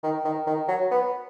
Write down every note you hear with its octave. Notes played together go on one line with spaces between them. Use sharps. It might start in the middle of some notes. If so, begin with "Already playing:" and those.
D#3
D#3
D#3
F#3
B3